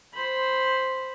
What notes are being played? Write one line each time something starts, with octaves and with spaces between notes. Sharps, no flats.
C5 B5